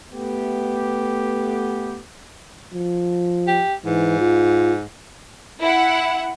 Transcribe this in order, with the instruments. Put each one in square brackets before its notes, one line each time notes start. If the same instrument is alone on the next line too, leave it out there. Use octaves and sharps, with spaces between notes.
[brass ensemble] A3 B3 G4
[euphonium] F3
[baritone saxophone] G4
[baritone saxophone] G#2 [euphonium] E3
[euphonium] F4
[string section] E4 F#5